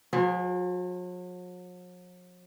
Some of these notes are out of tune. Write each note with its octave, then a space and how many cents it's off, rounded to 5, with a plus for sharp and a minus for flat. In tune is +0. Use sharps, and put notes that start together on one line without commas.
F#3 -45 G#4 +0 C5 +0